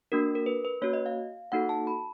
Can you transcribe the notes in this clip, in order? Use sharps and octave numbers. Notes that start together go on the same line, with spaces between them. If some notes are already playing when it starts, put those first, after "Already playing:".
A#3 D4 F#4 A#4
A#4
B4
B4
A#3 C#4 F#4 C#5
D#5
F5
A#3 D#4 F#4 A4 F#5
A5
B5